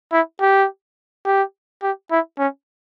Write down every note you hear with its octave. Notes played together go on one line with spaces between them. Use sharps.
E4
G4
G4
G4
E4
C#4